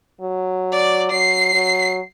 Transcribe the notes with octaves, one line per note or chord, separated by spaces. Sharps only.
F#3
D5
F#3 C7
F#3